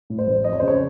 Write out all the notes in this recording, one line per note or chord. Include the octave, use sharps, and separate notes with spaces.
A2
C5
A1
F2 D#5
C#5
C#3 C5
C#5